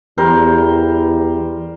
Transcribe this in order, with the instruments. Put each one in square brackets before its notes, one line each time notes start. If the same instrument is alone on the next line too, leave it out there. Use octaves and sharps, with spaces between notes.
[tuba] E2 [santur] G3 A#4 C5